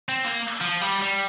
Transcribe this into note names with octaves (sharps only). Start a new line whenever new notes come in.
C4
A#3
F3
G3
G3